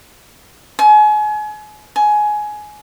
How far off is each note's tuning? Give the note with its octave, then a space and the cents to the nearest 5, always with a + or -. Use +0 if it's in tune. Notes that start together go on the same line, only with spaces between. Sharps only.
G#5 +35
G#5 +15